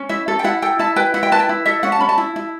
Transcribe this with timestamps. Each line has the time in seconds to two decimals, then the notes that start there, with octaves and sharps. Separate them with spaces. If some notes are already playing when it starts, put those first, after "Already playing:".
Already playing: C#4
0.09 E4 E5
0.28 A4
0.39 G5
0.44 E4 F#5
0.62 A4 G5
0.79 E4 A5
0.96 B4 G5
1.14 E4 F#5
1.23 G5
1.32 B4 A5
1.40 G5
1.49 E4
1.65 A4 E5
1.83 C#4 F#5
1.92 A5
2.00 C#4 B5
2.09 A5
2.18 E4
2.36 E4